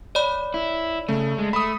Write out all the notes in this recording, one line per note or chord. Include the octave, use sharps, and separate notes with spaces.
C#5 D5 B5
E4
C#3 A3
G#3
A3 B5 D#6